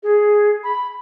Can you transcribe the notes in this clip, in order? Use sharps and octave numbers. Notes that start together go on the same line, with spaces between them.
G#4
B5